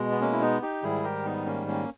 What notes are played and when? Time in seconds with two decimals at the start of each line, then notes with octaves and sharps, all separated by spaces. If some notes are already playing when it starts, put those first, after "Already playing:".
Already playing: B2 G#3
0.11 B3
0.21 A#3 C#4
0.32 E4
0.41 B3 D#4
0.62 D#4 G4
0.83 G#2 D#3 G3 E4 G#4
1.04 G4 A#4
1.25 B3 D#4
1.46 A#3 C#4
1.67 A#3 C#4